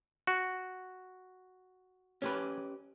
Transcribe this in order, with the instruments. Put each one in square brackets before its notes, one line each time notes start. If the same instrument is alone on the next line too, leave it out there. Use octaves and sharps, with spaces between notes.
[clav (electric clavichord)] F#4
[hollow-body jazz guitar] C#4 G4 B4